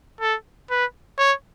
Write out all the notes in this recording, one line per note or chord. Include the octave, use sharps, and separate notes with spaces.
A4
B4
C#5